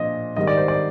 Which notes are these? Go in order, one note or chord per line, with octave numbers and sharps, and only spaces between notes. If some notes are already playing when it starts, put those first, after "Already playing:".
Already playing: A#2 F3 D4 D#5
G#2 D#3 G3 D#5
D5
C5
D5